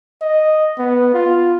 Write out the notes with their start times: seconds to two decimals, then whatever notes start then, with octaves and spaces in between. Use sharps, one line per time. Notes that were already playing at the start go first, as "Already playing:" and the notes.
0.22 D#5
0.78 B3
1.14 F4